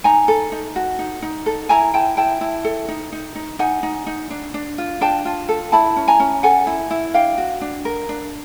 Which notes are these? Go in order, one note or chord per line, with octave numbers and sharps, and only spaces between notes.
D#4 G#5 A#5
A4
D#4
F#4
D#4
D#4
A4
E4 G#5 A#5
E4 G5 A5
E4 G5 A5
E4
A4
D#4
D#4
D#4
D#4 F#5 G#5
D#4
D#4
D4
D4
F4
D4 G5 A5
F4
A4
E4 A5 B5
C#4
G#5 A#5
C#4
A4 F#5 G#5
E4
E4
D4 F5 G5
F#4
D4
A#4
D4